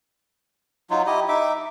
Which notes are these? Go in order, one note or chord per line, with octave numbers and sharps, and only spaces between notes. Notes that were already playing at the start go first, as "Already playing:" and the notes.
F#3 D#4 F4
E4 G4 D#5
D#4 E5 D6